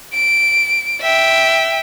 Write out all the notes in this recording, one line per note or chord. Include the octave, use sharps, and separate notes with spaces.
D7
E5 G5